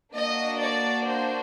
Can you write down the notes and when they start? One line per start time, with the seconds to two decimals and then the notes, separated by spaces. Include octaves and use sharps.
0.14 A#3 D4 F#4 D#5
0.60 D5
1.06 C5